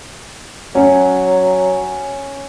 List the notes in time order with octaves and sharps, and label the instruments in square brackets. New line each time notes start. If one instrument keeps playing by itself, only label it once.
[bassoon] F#3 [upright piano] C#4